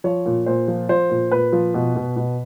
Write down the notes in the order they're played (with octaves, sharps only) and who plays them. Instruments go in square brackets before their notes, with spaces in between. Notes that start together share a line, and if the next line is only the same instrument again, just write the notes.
[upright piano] F3 C#5
A#2
A#2 C5
F3
F3 C5
A#2
A#2 B4
F3
B2
B2
B2